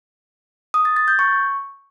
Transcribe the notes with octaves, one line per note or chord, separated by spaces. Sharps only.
D#6
A6
A6
G6
C#6